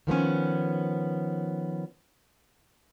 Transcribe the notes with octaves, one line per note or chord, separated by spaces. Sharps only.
D#3 F3 B3 C#4